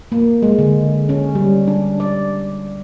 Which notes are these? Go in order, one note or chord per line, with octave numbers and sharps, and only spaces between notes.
A#3
G#3
D3
C#4
G3
D4
D5